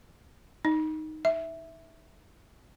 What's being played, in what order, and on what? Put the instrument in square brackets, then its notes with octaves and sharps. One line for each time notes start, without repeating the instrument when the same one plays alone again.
[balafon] D#4
E5